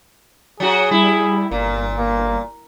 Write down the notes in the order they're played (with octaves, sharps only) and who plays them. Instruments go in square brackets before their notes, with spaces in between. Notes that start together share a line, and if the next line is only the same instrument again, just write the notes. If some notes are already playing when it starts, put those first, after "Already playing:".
[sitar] F#3 F#4 [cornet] G#4
[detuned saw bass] G3 [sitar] E4
[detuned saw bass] G1 [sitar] A#2 [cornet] A#3
[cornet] A#3